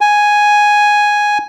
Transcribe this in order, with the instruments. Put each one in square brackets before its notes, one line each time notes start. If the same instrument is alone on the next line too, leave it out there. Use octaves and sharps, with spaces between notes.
[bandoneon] G#5